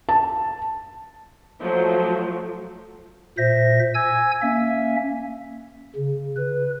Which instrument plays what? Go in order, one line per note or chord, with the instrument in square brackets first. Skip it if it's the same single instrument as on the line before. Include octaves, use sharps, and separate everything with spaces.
[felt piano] A5
[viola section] F3 F#3 A3
[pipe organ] A#2 C5 E5 A#6
G#5 E6 G#6
A#3 C#4 E5
C#3
B4